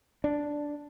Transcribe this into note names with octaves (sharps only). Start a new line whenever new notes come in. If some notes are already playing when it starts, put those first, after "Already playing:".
D4